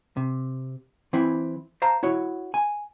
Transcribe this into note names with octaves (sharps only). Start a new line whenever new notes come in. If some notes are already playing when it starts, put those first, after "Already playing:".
C3
E3 C4 E4
C5 F5 A5 A#5
E4 F#4 C#5
G#5